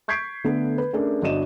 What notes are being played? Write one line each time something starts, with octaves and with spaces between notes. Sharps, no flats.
C#6 G6 G#6 B6 C7 D7
D3 A3 B3
B4
A3 C#4 D4 G#4 A#4
G1 D4 F#4 D#5 D#7 E7